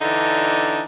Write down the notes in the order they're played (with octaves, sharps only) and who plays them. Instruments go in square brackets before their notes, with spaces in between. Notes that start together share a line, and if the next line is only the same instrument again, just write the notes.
[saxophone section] D3 E3 D4 D#4